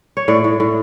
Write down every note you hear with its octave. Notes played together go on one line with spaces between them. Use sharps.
C#5
A2 D5
A2
A2